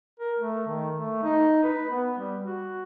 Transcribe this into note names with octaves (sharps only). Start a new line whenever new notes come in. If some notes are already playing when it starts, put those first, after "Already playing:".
A#4
A3
D#3
A3
D#4
B4
B3
G3
F#4